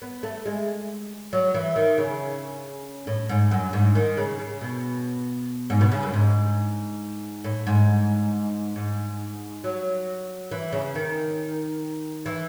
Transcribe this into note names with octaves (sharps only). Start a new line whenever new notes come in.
B3
A3
G#3
F#3
E3
D#3
C#3
A2
G#2
F#2
G#2
D#3
C#3
C#3
B2
G#2
B2
C#3
F#2
G#2
A2
G#2
G#2
F#3
E3
C#3
D#3
E3